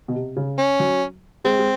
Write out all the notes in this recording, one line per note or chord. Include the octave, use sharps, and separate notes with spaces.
B2
C3
C#3
C#4
F#3
G#3 C4
G#3